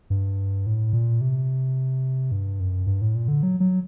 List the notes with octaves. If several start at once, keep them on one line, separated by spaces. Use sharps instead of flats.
G2
A2
A#2
C3
G2
F#2
G2
A2
A#2
D3
F#3
F#3